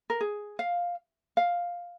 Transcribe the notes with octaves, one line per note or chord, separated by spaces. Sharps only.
A#4
G#4
F5
F5